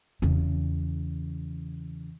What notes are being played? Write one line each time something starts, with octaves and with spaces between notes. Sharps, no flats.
E2 C#3